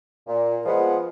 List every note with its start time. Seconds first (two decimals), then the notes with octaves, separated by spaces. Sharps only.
0.28 A#2
0.65 F3 G#3 B3